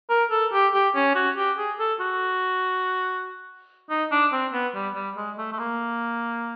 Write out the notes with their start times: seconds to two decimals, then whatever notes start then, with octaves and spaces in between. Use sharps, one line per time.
0.10 A#4
0.31 A4
0.53 G4
0.74 G4
0.95 C#4
1.15 F#4
1.37 G4
1.58 G#4
1.79 A4
2.00 F#4
3.90 D#4
4.12 D4
4.33 C4
4.53 B3
4.75 G3
4.95 G3
5.16 G#3
5.38 A3
5.52 A3
5.59 A#3